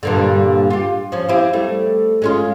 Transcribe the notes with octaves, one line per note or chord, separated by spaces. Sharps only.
G2 A#2 D3
F4 G4
F3 C#4
C4 E4 G4
G3 A3
G#3 C#4 F4